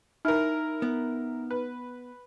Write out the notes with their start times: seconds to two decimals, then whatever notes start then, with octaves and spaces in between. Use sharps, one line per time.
0.25 D#4 E4 A#4 F6
0.82 B3
1.51 B4